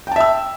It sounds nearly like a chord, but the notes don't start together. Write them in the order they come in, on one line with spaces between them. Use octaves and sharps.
G5 A5 E5 E6